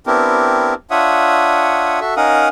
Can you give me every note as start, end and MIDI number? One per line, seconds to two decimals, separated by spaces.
0.07 0.74 59
0.07 0.74 60
0.07 0.74 62
0.07 0.74 64
0.07 0.74 67
0.07 0.74 70
0.91 2.00 62
0.91 2.00 65
0.91 2.00 73
0.91 2.00 76
0.91 2.00 78
0.91 2.00 87
2.01 2.14 66
2.01 2.14 69
2.01 2.14 76
2.17 2.48 61
2.17 2.48 63
2.17 2.48 70
2.17 2.48 77
2.17 2.48 78
2.17 2.48 87